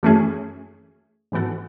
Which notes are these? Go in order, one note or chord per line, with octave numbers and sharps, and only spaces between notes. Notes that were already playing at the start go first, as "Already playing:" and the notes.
F#2 E3 A3 C#4 G#4
G#2 E3 B3 F#4 A4